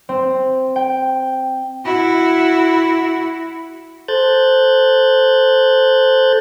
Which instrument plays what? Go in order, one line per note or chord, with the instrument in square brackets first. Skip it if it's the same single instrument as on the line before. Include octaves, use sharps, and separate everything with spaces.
[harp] C4
G5
[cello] E4 F#4
[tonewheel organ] A4 C5 F#6 G6 A6